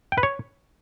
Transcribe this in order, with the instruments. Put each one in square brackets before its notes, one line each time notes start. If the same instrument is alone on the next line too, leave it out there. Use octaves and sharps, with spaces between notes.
[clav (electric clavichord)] G5
B4
C#5